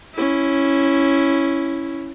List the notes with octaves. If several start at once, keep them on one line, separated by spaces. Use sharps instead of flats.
C#4 E4